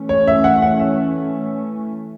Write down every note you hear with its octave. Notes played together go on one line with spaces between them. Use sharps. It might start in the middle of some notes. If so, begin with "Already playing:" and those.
Already playing: E3 A3 C#4
C#5
E5
F#5
F#5
E5